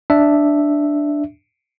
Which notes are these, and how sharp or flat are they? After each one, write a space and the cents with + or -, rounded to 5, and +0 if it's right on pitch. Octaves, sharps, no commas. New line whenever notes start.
D4 +0 E5 +0